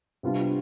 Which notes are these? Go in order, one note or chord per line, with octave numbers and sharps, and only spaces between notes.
C3 G3 B3 D4 F4